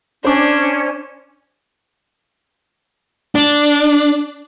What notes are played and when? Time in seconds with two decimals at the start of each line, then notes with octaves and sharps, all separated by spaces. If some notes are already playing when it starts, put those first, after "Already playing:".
0.24 C#4 D4 C5 D5 D6
3.35 D4